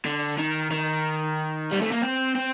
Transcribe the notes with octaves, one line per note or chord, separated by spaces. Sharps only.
D3
D#3
D#3
G3
A3
A#3
C4
C4